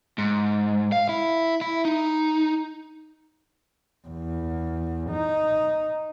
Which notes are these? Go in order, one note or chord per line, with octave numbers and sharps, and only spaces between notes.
G#2
F5
E4
E4
D#4
E2
D#4